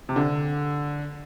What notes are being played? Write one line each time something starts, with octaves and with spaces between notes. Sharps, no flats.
C3
D3